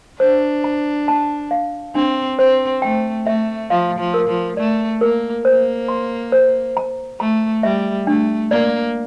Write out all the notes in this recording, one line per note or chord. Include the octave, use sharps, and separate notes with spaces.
D4 C5
A#5
A5
F5
C4 D4
C4 C5
A3 G5
A3 E5
F3 F5
F3
A#4
F3
A3 D5
A#3 A#4
A#3 C5
C6
C5
A#5
A3 A#5
G3 E5
A3 D4
A#3 D5